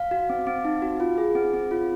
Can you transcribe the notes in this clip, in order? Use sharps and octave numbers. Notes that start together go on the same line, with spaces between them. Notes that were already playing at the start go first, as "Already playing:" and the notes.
Already playing: F5
F#4
C4
C4
D#4
F#4
F4
G#4
C4
C4
F4